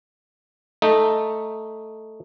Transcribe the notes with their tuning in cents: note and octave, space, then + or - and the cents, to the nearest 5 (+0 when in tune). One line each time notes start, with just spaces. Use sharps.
A3 +0 D#4 +0